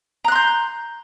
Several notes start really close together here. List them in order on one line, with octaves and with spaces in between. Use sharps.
A#5 F#6 C6 G6